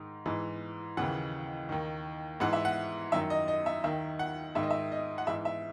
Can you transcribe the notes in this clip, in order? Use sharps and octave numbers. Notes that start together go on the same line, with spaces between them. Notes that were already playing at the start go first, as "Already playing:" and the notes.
Already playing: G#2 D#3
G#2 E3
D#2 C#3 E3 F#5
D#2 D#3
G#2 E3 F#5
E5
F#5
F#2 D#3 E5
D#5
D#5
E5
D#2 D#3 E5
F#5
G#2 D#3 E5
D#5
E5
D#5
F#5
G#2 E3 E5
E5